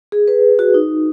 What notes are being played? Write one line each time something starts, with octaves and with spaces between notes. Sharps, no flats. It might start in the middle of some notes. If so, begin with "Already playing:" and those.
G#4
B4
F#4
D#4